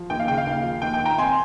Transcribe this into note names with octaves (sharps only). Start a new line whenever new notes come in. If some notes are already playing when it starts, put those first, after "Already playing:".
Already playing: F3
D#2 G5
F5
C#3 G5
F5
D#2
F3
D#2 G5
G5
D#3
G5 A#5
C4 G#5 C6